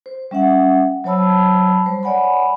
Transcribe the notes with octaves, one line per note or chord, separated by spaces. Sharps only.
C5
G3 C#4 E5 F#5
F#3 C5 C#5 A5 B5 E6
G3 C5
C#5 D5 F#5 G#5 B5